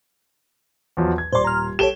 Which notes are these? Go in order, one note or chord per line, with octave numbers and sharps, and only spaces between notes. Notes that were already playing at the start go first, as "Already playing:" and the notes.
E2 F3 F#3
G#6
D#1 C5 D5 C6
A#5 F6
G4 A4 C#5 E7 G7